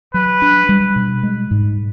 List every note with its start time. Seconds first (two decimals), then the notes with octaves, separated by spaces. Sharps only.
0.14 F#3 B4
0.42 D4
0.69 G3
0.96 B2
1.23 G#3
1.51 G#2